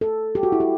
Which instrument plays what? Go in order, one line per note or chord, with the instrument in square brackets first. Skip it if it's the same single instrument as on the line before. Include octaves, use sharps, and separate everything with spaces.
[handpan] A4
G4
F#4
E4
G4